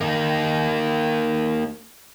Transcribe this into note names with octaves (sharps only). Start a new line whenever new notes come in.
A#3 D#4